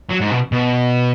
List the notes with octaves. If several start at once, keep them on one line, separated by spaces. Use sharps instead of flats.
F#3
G#2
B2
B2